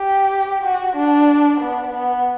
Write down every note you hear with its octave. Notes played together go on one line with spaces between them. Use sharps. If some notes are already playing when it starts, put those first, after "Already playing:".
Already playing: G4
F#4
D4
B3
B3